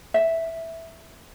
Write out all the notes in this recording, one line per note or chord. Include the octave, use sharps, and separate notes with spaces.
E5